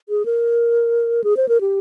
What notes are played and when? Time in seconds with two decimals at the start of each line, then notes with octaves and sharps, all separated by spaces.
0.09 G#4
0.26 A#4
1.24 G#4
1.37 C5
1.49 A#4
1.61 G4